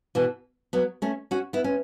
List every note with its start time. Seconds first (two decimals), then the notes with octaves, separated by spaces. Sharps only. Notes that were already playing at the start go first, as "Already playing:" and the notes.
0.15 B2 E3
0.73 F#3 B3
1.02 A3 C#4
1.31 C#4 F#4
1.53 B3 E4
1.64 C#4